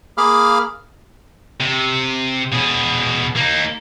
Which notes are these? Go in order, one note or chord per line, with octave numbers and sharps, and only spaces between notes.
A#3 G#4 F5 B5 D6 F6
C3
B2 G#4
A#3 D#4